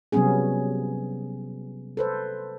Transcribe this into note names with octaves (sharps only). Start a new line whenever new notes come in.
C3 F#3 G3 B3 C#4 G#4
A4 B4 C5